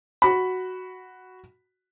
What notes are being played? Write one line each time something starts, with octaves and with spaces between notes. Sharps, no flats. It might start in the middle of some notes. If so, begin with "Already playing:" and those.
F#4 B5